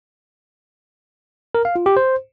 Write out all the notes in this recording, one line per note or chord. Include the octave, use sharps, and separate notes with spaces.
A#4
F5
F4
G4
C5